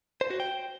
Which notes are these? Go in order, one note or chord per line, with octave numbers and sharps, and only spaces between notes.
C5
F#4
G5